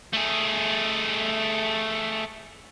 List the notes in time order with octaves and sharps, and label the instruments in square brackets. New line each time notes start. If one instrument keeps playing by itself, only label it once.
[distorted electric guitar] A3 G#4